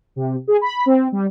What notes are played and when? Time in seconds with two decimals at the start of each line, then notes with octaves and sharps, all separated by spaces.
0.16 C3
0.47 G#4
0.61 B5
0.86 C4
1.12 G3